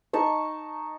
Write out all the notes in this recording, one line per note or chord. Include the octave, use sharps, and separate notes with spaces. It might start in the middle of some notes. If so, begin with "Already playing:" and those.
D#4 A5 C#6